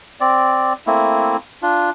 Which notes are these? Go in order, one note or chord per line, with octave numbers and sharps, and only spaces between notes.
C4 D5
A3 A#3 C4 E4
D4 F4